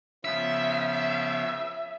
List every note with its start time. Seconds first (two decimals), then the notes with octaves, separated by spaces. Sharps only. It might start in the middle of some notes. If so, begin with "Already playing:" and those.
0.25 C#3 F3 B3 E5